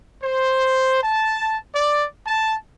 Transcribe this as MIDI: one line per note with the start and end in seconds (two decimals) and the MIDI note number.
0.23 1.02 72
1.04 1.57 81
1.75 2.06 74
2.27 2.56 81